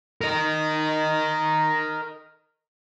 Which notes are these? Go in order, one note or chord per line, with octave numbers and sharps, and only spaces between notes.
A#4 D#5